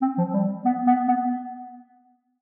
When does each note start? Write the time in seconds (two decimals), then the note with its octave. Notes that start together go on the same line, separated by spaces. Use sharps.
0.02 C4
0.18 F3
0.34 G3
0.65 B3
0.87 B3
1.08 B3